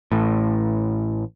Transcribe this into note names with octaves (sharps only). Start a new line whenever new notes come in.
A1 A2